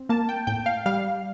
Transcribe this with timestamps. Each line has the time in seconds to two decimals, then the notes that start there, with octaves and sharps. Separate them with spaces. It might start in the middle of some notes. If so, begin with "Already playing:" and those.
Already playing: C4
0.09 A#3 A5
0.29 G5
0.47 A2 G5
0.66 F5
0.86 G3 F5